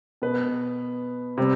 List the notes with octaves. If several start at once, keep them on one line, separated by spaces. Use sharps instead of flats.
B2 B3 B4
C3 G3